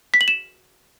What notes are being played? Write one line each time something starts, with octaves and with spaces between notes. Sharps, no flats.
B6
F#7
E7